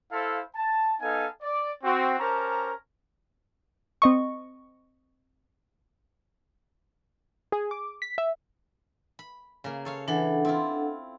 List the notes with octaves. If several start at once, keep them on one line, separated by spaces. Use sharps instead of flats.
E4 A4 C5 F5
A5
B3 D#4 A4 F5 G#5
D5
C4 F#4
C#4 G4 A#4 C5 A5 A#5
C4 D#5 C#6
G#4
D6
B6
E5
B5
C#3 A#3
A4 C#5 F5
E3 D4 A4 F#5
C4 E4 F4